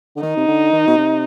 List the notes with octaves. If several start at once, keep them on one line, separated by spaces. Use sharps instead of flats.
D3
D#3 D#4
C3
D3
D#3
B2
C3